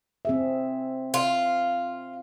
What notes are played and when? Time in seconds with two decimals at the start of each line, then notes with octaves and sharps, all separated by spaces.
0.25 C4 G#4 E5
1.14 F4